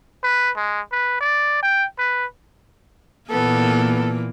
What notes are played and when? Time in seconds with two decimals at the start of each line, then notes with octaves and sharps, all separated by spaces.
0.23 B4
0.56 G#3
0.92 B4
1.21 D5
1.63 G5
1.98 B4
3.30 A#2 E3 A#3 B3 A4